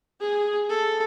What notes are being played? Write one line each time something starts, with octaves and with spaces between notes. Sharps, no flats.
G#4
A4